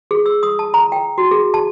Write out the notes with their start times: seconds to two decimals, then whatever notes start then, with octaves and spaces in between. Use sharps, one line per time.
0.11 G#4
0.26 E6
0.43 D#6
0.59 A5
0.74 A#5
0.92 G5
1.18 F#4
1.31 G#4
1.54 A5